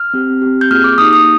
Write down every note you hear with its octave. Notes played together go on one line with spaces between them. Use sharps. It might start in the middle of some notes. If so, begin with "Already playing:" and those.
Already playing: F6
C4 G4
C4 G4
G6
A#3 F4 G#4 F6
D6
A#3 D#4 G4 D#6
D#6